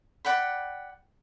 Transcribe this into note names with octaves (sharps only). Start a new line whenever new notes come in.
D5 F#5 G5 B5